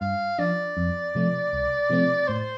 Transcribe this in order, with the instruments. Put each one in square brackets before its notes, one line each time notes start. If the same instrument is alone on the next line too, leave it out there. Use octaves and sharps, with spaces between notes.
[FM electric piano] G2 [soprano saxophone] F5
[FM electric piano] F3 D4 [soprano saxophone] D5
[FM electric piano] F2
C3 F3 A3
C2
C3 F3 A3 C4
[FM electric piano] A2 [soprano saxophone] C5